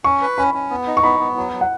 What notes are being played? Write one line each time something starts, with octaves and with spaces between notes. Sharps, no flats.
C#4 C#6
B4
C#4 B5
C#4
B3
D#4
C#6
B3 B5
B3
F#3
F#3
F#5